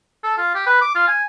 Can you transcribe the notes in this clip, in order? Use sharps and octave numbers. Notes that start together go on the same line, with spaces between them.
A4
F4
G4
B4
D6
F4
G#5